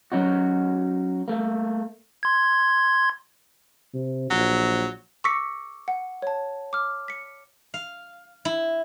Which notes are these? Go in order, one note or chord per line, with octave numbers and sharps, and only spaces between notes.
F#3 C#4 D#4 F#4
A3 A#3
C6 G#6
C3
A#1 F#3
C#6 D6 E6 A#6 B6 C#7
F#5
C#5 A5
D6 F6
B6 C#7
F5
E4